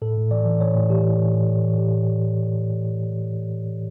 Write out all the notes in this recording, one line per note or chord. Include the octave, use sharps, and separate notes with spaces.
A2 A4
A2
E3 D5
E3
A2 C#5
A2
E3 G4
E3
A2
A2
E3
E3
A2 G4